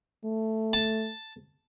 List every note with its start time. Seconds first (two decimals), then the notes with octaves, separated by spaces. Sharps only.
0.25 A3
0.73 A5